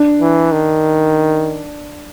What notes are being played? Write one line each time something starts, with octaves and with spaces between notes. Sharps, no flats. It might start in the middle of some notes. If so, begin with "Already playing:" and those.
Already playing: D4
E3
D#3